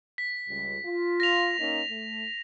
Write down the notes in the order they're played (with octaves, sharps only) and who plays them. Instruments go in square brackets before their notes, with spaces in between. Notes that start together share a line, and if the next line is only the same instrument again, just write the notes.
[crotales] B6
[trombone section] C#2 G3
F4
[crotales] A#6 F7
[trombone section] A#3 C#4 D#4
A3